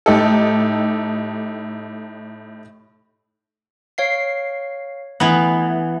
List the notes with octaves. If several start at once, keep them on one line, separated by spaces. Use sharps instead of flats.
A2 D#4 G4 A4
C#5 F5 C7
E3 A3 B3